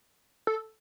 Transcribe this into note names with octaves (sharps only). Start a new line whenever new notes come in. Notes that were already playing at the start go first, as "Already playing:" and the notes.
A4